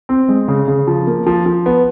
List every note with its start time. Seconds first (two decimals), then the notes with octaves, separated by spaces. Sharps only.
0.09 C4
0.28 G#3
0.48 C#3
0.68 C#3
0.87 F3
1.07 A#3
1.27 F3
1.46 F3
1.66 B3